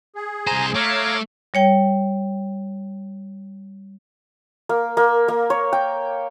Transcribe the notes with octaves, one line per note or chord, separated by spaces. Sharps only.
G#4
C2 C5 G#5 A#5
A3 C#5 F5 A#5 D6
G3 C#5 G5
A#3
A#3
A#3
C#5
G5